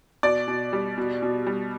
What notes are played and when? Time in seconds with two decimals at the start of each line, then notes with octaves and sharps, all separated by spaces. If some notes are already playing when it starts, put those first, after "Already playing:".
0.23 B2 D5
0.48 B2
0.73 G3
0.98 B2
1.22 B2
1.47 G3